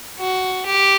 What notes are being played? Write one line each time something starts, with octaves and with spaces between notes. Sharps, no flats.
F#4
G4